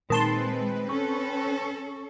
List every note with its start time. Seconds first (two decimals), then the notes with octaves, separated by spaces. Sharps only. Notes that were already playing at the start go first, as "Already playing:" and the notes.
0.10 A#2 D#3 G#3 C4 B4 A5 C6
0.89 C#4 A4 C#6